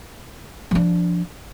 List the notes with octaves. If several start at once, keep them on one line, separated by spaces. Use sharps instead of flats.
F3 D4